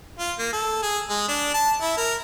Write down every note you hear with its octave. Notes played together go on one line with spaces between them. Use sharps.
F4
A#3
A4
G#4
G#3
D4
A5
E4
A#4